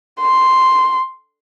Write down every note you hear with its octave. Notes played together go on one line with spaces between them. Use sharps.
C6